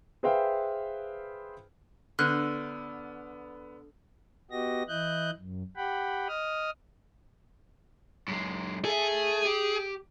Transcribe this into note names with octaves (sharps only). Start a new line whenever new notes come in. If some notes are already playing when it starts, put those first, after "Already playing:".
G#4 B4 C5 E5 F5 G5
D3 B3 F6 F#6
B3 F#4 G4 D#5 A#6
E3 E4 D#5 F#6 G6
F#2
G4 F#5 G5 B5
D#5 D#6 F6
F#2 G#3
G#4 A4 E5
G4